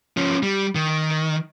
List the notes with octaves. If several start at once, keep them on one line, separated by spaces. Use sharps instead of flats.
F3 C#4
G3
D#3